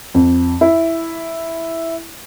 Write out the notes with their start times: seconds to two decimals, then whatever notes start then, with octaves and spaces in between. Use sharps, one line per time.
0.14 F2
0.61 E4